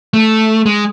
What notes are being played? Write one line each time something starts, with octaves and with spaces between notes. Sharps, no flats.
A3
G#3